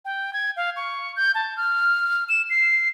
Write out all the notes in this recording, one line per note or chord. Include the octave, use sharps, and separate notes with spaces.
G5
G#6
F5
C#6
G6
A5
F6
E7
C7